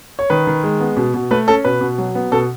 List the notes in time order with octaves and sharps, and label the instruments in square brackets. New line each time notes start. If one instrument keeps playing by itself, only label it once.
[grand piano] C#5
D#3 B4
D#3
G#3
B3
B2
B2
A3 B4
C#4 A4
B2 B4
B2
F#3
B3
B2 A4